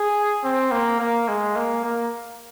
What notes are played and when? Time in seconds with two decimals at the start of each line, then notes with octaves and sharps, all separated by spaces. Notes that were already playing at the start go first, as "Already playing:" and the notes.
Already playing: G#4
0.43 C4
0.72 A#3
1.00 A#3
1.28 G#3
1.56 A#3
1.84 A#3